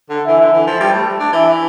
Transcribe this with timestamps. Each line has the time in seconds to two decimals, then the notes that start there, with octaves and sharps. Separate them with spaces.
0.09 D3
0.27 E3 E5
0.41 D3
0.54 E3
0.67 F3
0.80 G3
0.93 A3
1.20 D4
1.33 E3 E5